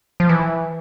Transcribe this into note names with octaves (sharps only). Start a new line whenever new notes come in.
F3
E3